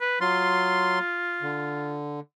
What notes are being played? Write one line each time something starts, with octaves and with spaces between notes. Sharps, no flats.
B4
F#3 F4 C6
D3